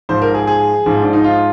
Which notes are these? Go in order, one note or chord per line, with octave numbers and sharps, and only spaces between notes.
G#2 F3 C5
A#4
G#4
G#4
G#2 F3
D4
D#4
F4